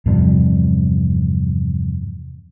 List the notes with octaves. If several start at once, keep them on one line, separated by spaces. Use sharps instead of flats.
E2 G2 C3 F3